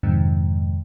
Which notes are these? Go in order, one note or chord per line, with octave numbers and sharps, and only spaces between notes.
F2 G#2 C3 D#3